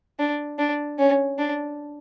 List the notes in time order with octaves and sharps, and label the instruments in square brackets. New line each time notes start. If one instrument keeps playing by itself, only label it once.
[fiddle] D4
D4
C#4
D4